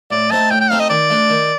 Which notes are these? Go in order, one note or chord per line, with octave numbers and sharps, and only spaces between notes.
A2 D5
A3 C4 D#4 A5
A2 G5
G5
A3 C4 D#4 F5
D#5
D#3 D5
A3 D4
D#3